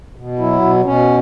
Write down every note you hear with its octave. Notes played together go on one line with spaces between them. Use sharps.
B2
F#3 E4
B2
B2 C#4